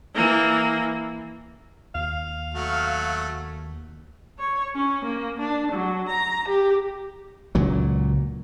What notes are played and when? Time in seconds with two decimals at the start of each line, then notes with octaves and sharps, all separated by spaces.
0.15 E3 A#3
1.95 D#2 F5
2.55 F#3 A3 F#4
4.39 C#5
4.75 C#4
5.04 A#3
5.39 D4
5.72 F#3
6.08 A#5
6.48 G4
7.55 C#2 A#2 F#3